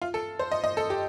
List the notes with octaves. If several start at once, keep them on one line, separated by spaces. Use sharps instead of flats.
F4
A4
C5
D#5
D#5
A4
G4